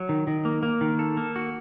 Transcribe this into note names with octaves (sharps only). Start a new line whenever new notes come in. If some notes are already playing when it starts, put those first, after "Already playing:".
Already playing: F#3
D#3
D#3
A#3
A#3
D#3
A4
A#3
F#4